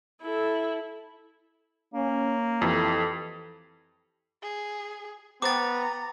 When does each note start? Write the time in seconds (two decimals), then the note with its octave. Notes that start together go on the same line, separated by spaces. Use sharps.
0.22 E4 A4
1.94 A#3 C#4
2.62 F2 E3 G4 A4
4.42 G#4
5.42 B3 C5 G5 A#5 D6 A6